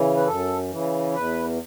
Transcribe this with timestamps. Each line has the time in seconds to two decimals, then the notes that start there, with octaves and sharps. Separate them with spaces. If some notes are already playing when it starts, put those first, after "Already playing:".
Already playing: C#3 E3
0.17 B4
0.27 F#2 A4
0.71 C#3 E3
1.15 E2 B4